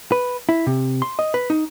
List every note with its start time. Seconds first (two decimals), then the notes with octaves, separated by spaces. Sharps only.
0.12 B4
0.49 E4
0.67 C3
1.02 C6
1.19 D#5
1.34 B4
1.50 D#4